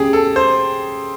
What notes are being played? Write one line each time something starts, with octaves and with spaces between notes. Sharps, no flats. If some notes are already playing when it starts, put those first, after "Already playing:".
Already playing: C#3 G4 G#4
A4
C5